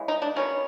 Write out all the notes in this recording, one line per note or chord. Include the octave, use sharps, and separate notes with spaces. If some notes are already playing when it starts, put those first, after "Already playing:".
Already playing: C#3 E3 G#3
D#4
D4
D#3 F#3 B3 C#4